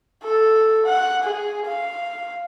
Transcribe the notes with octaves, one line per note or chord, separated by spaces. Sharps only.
A4
F#5
G#4
F5